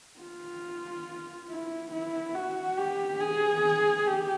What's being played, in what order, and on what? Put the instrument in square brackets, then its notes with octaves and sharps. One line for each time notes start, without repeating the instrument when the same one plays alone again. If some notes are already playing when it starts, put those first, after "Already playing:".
[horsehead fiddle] F4
E4
E4
F#4
G4
G#4
G4